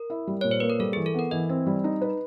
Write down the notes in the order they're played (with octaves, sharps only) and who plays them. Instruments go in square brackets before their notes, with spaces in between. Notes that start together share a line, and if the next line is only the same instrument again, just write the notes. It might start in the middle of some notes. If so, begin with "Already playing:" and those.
Already playing: [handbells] A#4
[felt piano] E4
G3
[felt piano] A#2 [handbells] C#5
[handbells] C5
[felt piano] A#3 [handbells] B4
[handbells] A#4
[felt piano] G3 [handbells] A4
[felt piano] E3 [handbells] G#4
[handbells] A4
[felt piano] B3 [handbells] A#4
[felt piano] E3 [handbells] D#5
[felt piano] C4
G3
D#4
B4